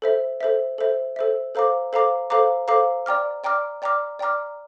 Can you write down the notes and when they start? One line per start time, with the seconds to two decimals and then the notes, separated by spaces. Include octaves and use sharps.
0.02 A4 C5 E5
0.41 A4 C5 E5
0.78 A4 C5 E5
1.16 A4 C5 E5
1.55 A4 C5 F5 A#5 D6
1.93 A4 C5 F5 A#5 D6
2.30 A4 C5 F5 A#5 D6
2.68 A4 C5 F5 A#5 D6
3.06 D5 G5 A#5 D6 F6
3.44 D5 G5 A#5 D6 F6
3.82 D5 G5 A#5 D6 F6
4.19 D5 G5 A#5 D6 F6